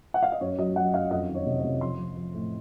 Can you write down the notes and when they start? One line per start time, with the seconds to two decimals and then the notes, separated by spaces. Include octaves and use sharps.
0.14 F#5
0.23 F5
0.32 D#5
0.41 F#2 C#5
0.59 F#3 D#5
0.76 F#3 F#5
0.94 F#2 F5
1.11 F2 D#5
1.29 D#3
1.35 C#5
1.46 C3
1.58 C#5
1.64 C3
1.81 F3 C6
1.99 F3
2.17 F3
2.34 A2